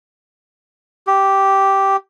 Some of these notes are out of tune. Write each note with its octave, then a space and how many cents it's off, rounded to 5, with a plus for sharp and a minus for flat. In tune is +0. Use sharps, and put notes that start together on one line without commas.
G4 -5